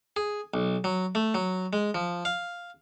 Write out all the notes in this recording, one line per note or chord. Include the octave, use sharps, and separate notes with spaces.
G#4
B1
F#3
A3
F#3
G#3
F3
F5